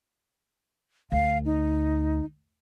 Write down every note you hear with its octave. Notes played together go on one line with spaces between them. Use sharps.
D2 F5
D#4